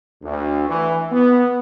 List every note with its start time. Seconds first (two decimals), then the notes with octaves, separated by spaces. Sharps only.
0.23 D2
0.67 E3
1.10 B3